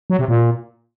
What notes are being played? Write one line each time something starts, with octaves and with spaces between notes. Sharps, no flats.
F#3
C3
A#2